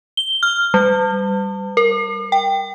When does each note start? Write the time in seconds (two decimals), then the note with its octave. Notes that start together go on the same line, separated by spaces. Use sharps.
0.17 G7
0.43 F6
0.74 G3
1.77 A#4
2.32 G5